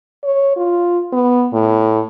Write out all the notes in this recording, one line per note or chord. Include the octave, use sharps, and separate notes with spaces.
C#5
F4
B3
A2